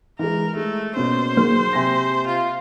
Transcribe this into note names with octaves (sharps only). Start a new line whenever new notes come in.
E3 G#3 A#4
G#3 A3
B2 A#3 C#4 C5
D#3 F#3 A#3 G#4
C3 G#5 A#6
F4